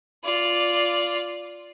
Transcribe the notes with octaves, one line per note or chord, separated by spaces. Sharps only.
F4 D5